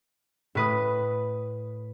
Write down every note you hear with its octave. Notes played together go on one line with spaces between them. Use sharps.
A2 B4 D#6